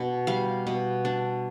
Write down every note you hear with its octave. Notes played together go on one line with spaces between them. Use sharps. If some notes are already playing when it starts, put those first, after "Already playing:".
Already playing: B2 D4
G3 F5
B2
D4